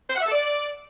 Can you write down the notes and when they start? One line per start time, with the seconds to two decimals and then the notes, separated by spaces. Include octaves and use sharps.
0.10 C5
0.15 F#5
0.21 E5
0.26 A4
0.32 D5